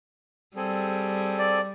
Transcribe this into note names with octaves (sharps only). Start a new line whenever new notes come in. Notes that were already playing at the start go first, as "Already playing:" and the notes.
G3 C4 G#4 A4
D5